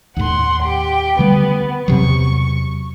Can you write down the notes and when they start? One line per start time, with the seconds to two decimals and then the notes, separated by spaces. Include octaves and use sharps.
0.17 D#2 A2 F#5 C6
0.63 G4 G5
1.19 D3 G3 A3 B3
1.88 E2 C3 F#3 C#6